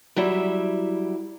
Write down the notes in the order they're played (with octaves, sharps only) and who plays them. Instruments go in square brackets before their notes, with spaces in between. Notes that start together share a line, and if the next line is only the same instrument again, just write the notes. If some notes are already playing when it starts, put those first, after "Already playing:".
[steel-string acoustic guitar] F#3 G3 E4 E5